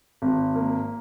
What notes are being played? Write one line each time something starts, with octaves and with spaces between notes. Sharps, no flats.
G#1
A#3